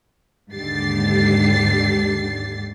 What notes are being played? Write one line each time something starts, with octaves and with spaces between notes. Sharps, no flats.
D#2 G#2 D3 G4 A6 C7